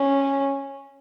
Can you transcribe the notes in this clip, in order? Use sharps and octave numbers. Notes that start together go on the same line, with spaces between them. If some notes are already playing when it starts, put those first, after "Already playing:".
Already playing: C#4